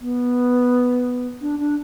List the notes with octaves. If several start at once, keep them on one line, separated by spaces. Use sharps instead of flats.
B3
D4
D4